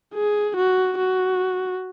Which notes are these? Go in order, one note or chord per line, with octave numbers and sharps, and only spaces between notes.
G#4
F#4
F#4